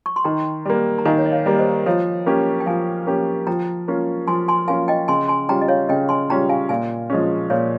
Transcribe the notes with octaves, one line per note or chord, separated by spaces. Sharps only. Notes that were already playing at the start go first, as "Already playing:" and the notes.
C#6
C6
D#3 G5 A#5
G3 A#3
A#5
D#3 F5 G#5
C#5
D#5
C#5 F5
G3 A#3
C5 D#5
F3 C#5 F5
A#3 C#4 G4
G5
F3 F5 G#5
A#3 C#4 G4
F3 G5 A#5
A#3 C#4 F4
F3 G#5 C6
G#5 C6
A#3 C#4 F4 F5 G#5
D#5 G5
C#3 G#5 C6
G#5 C6
G3 C#4 F4 G5 A#5
D#5
C#5 F5
C#3 D#5 G5
G#5 C6
G3 C#4 F4 G5 A#5
F5 G#5
A#2 F5 G#5
F3 G#3 C#4
A#2 C#5 F5